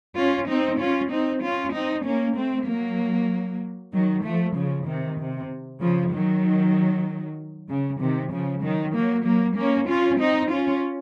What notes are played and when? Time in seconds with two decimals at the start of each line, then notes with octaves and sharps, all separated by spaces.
0.17 C#4 F4
0.48 C4 D#4
0.79 C#4 F4
1.11 C4 D#4
1.43 C#4 F4
1.74 C4 D#4
2.05 A#3 C#4
2.36 A3 C4
2.67 F#3 A#3
3.93 D#3 F#3
4.24 F3 A3
4.55 C#3 F3
4.87 C3 D#3
5.19 C3
5.81 C#3 F3
6.12 D#3 F#3
7.69 C#3
8.00 C3 D#3
8.32 C#3 F3
8.63 D#3 F#3
8.95 F#3 A#3
9.26 F#3 A#3
9.57 A#3 C#4
9.89 C#4 F4
10.20 C4 D#4
10.51 C#4 F4